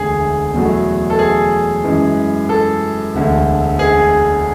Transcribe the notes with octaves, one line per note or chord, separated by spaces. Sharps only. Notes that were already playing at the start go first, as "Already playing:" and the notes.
Already playing: E1 D2 D3 A3 G#4
E2 B2 F#3 A3
A4
G#4
F#2 E3 G#3
A4
E1 D2 D3
G#4